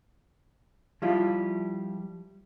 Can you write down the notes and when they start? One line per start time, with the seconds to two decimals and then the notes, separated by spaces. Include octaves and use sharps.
1.02 F3 G3 E4 F4